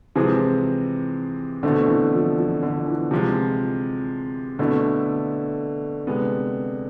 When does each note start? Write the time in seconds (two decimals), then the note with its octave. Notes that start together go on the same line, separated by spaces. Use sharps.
0.15 C3 E3 F3 G#3 C4 G#4
1.63 B2 D3 A3 C4
1.88 E3
2.13 F3
2.37 F3
2.63 D3
2.87 E3
3.11 C3 F3 G#3
4.59 B2 D3 A3 E4
6.07 C3 G#3 B3